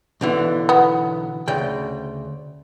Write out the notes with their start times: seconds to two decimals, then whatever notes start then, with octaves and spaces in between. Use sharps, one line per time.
0.21 B1 D3 E3
0.69 B3
1.48 D2 C#3 G5